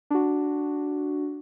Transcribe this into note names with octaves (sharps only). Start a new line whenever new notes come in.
D4 F#4